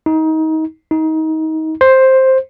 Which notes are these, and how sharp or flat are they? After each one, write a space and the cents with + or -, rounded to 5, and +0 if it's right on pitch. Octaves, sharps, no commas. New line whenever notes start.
D#4 +25
D#4 +25
C5 +5